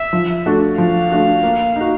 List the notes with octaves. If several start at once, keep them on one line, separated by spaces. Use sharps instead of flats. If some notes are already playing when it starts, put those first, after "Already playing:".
Already playing: E5
F3
A3 D4 F#4 A4
F3 F5
A3 D4 F#4 A4
A#3
D#4 F#4